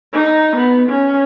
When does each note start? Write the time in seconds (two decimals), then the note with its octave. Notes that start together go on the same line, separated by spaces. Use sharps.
0.13 D#4
0.56 B3
0.89 C#4